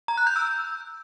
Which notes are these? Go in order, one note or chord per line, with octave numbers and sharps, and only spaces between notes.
A#5
F#6
G6
E6